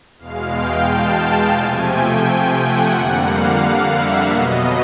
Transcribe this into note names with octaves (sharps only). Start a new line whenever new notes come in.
E2 B2 G#3 F5
G5
A5
C3 F3 A3 G#5
G5
F#5
F2 D3 G3 A#3
F5
E5
B2 F#3 B3 D#5